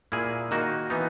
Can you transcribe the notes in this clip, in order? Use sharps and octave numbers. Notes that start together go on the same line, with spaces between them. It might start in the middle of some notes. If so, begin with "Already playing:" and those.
A#2 A#3 E4 G#4
D#3 A#3 D#4 F#4
E3 B3 D#4